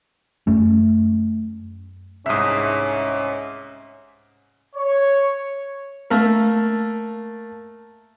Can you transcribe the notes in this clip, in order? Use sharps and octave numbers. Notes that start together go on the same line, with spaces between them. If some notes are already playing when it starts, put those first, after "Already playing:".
F#2 A3 C#4
C2 G#2 C#4 E5 D#6
C#5
A3 A#3 A#4